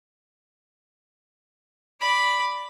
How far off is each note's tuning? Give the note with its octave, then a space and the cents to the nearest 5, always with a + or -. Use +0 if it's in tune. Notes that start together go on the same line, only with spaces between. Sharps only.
D5 +0 B5 +0